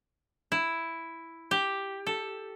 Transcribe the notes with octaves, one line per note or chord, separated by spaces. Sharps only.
E4
G4
A4